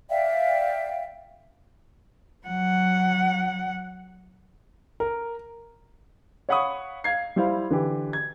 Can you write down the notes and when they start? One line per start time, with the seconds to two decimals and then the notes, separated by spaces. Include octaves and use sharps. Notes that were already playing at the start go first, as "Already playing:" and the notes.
0.09 D5 E5 F5 G5
2.46 F#3 F#5
5.00 A#4
6.49 C#5 F5 F#5 B5 C#6 D#6
7.04 F5 G#6 C7
7.36 G3 E4 C5 F5
7.70 D3 E3 G4
8.13 G#6